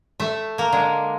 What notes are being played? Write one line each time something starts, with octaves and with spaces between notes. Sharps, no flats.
A3 E5
A#3 A#4
D3 G#3